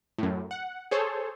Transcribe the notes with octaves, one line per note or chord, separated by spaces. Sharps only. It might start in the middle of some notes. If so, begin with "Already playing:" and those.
F#2 A2
F#5
G#4 A4 C5 C#5